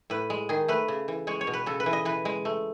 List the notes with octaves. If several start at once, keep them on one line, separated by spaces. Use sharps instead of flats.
A2 B4
G#3
D#3 G#4
A3 B4
C#3
E3
G#3 C#5
C#5
B2
B4
C#3 A4
B4
E3
D#5
E3 B4
G#3
A3